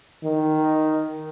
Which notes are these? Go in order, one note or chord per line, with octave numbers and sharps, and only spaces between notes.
D#3